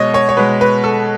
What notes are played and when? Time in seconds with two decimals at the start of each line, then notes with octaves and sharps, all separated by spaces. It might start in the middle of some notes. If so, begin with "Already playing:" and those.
Already playing: B2 G#3 C#5 D#5
0.14 C#5
0.29 C#5
0.37 B2 G#3 B4
0.61 B4
0.84 A4